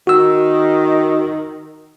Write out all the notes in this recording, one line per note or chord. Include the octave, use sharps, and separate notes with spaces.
D#3 F#4 E6